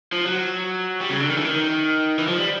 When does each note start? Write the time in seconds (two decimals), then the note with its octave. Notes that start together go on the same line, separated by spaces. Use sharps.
0.13 F3
0.27 F#3
1.01 G3
1.10 C#3
1.20 D3
1.30 D#3
1.37 E3
1.45 D#3
2.19 E3
2.28 F3
2.38 G3